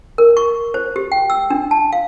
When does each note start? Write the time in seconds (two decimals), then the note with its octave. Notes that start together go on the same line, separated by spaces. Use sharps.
0.18 A#4
0.37 C#6
0.74 C5
0.96 G4
1.12 G5
1.30 E6
1.50 D4
1.71 A5
1.92 F5